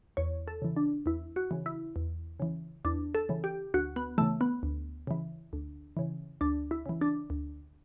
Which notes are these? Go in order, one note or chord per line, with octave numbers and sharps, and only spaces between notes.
E2 C#5
A4
C#3 E3
D4
E2 E4
F#4
C#3 E3
E4
E2
C#3 E3
E2 D4
A4
C#3 E3
G4
D2 F#4
B3
C#3 E3 A3
B3
D2
C#3 E3
D2
C#3 E3
D2 D4
E4
C#3 E3
D4
D2